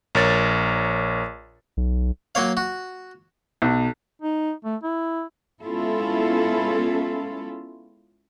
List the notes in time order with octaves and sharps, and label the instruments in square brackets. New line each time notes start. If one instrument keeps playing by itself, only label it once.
[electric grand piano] A#1 A#4 C#5 A6
[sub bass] B1
[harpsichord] F#3 A#3 C#5 F5
F#4
[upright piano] B1
[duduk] D#4
A3
E4
[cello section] G#3 B3 C#4 E4 F4 A4